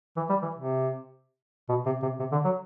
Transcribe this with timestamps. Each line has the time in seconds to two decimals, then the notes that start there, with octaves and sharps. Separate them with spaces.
0.17 E3
0.29 G3
0.42 E3
0.55 C3
1.69 B2
1.86 C3
2.03 C3
2.20 C3
2.32 D3
2.45 F#3